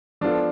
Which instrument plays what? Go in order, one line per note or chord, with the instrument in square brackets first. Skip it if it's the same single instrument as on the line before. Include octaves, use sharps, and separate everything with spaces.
[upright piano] F3 B3 F4 A4 [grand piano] D4